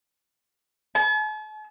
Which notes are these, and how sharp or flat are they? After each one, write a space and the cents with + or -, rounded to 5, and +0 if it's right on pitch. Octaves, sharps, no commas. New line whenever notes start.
A5 -45